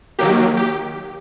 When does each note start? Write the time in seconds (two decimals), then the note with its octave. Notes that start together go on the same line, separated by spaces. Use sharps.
0.19 D#3 F#3 A#3 G4
0.57 G4